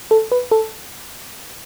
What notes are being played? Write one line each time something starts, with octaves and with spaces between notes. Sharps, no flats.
A4
B4
A4